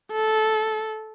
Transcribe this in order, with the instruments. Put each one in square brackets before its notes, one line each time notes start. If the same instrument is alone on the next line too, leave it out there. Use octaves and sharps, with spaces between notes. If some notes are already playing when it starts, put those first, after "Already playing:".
[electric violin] A4